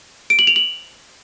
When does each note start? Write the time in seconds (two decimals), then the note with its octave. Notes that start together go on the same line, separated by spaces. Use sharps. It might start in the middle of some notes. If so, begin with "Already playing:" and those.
0.30 D7
0.39 F#7
0.47 F7
0.56 F#7